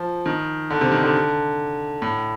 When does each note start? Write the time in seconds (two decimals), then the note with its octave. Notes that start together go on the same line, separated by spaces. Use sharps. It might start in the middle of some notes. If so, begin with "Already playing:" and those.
Already playing: F3
0.26 D#3
0.70 D3
0.81 C3
0.92 D#3
1.03 D3
2.02 A2